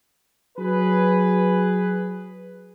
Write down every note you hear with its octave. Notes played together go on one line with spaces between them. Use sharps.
F#3 G#4 B4